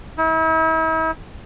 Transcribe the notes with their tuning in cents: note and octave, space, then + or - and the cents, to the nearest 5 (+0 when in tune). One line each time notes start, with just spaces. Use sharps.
E4 -45